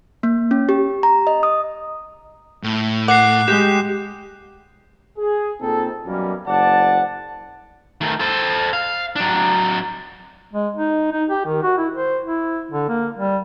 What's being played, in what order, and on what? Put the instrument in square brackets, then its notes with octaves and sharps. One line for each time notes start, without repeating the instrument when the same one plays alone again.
[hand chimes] A#3
C#4
G4
A#5
D#5
D#6
[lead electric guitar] A2
[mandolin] F#5 [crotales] D6 F#6 C7
[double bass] G#3 [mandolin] G4 [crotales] E7
[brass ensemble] G#4
A#2 C4 D#4 A4
F#2 B2 E3 G3 A#3 C#4
F#1 C5 D5 F#5 A5
[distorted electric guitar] D#3 A3
A4 C5
F5
F#3 D4
[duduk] G#3
D#4
D#4
G4
D#3
F#4
E4
C5
E4
D3
A#3
G3